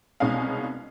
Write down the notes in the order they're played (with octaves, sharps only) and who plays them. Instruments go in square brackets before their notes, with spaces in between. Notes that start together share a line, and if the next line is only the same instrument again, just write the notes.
[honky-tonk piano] C2 B2 G#3 C#4 D#4 F5